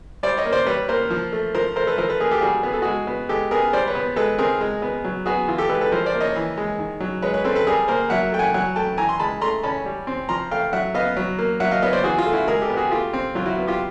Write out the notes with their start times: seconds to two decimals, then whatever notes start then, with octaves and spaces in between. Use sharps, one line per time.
0.23 G3 C5 D5
0.37 C#5 D#5
0.45 A#3
0.53 C5 D5
0.66 G3 B4 C#5
0.89 A#3 A#4 C5
1.10 F3
1.33 A3
1.55 F3 A#4 C5
1.76 A3 A#4 C5
1.87 A4 B4
1.98 F3 A#4 C5
2.09 A4 B4
2.20 A#3 G#4 A#4
2.31 G4 A4
2.41 G3 F#4 G#4
2.63 B3 G#4
2.74 A4
2.82 G#3 F#4 G#4
3.07 B3
3.29 G#3 G4 A4
3.51 B3 G#4 A#4
3.73 G3 C5 D5
3.87 B4 C#5
3.95 B3
4.16 G#3 A4 B4
4.38 C4 G#4 A#4
4.61 G#3
4.82 B3
5.05 F#3
5.26 B3 F#4 G#4
5.48 E3 F4
5.58 G4 A4
5.69 G#3 A4 B4
5.81 A4 B4
5.92 F3 A#4 C5
6.06 C5 D5
6.14 A#3
6.21 C#5 D#5
6.36 E3
6.58 G#3
6.79 D#3
7.00 F#3
7.22 G#3 B4 C#5
7.34 B4 C#5
7.45 C4 A4 B4
7.55 A4 B4
7.67 G3 G#4 A#4
7.88 A#3 A#4 C5
8.10 F#3 E5 F#5
8.32 A3 G5
8.39 F#5 G#5
8.54 F#3 F#5 G#5
8.76 A3 G5 A5
8.98 E3 G#5 A#5
9.09 C6
9.20 G#3 A5 B5
9.41 A3 A#5 C6
9.63 C#4 A5 B5
9.85 G3
10.07 C4
10.29 F3 A#5 C6
10.51 A3 F5 G5
10.73 F#3 E5 F#5
10.94 B3 D#5 F5
11.17 F#3
11.38 A#3
11.60 F#3 E5 F#5
11.71 D#5 F5
11.82 B3 C#5 D#5
11.93 C5 D5
12.04 E3 F#4 G#4
12.18 F4
12.26 A3
12.33 E4 F#4
12.47 G#3 G#4 A#4
12.62 G4 A4
12.69 B3
12.77 F#4 G#4
12.91 A3 F4 G4
13.13 C4
13.35 F#3 F4
13.46 E4 F#4
13.57 B3
13.67 F4 G4